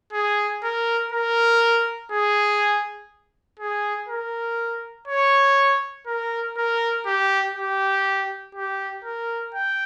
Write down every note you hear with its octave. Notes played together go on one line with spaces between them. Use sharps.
G#4
A#4
A#4
G#4
G#4
A#4
C#5
A#4
A#4
G4
G4
G4
A#4
G5